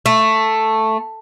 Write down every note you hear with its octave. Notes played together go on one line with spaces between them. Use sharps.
A3